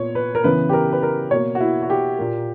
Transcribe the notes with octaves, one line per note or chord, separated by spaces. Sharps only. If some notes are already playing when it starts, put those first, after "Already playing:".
Already playing: A#2 B3 C#5
B4
A#4
C#3 E3 B3 B4
G4
A#4
B4
A#4
B2 A#3 C#5
F#4
E4
F#4
G4
A#2 A#3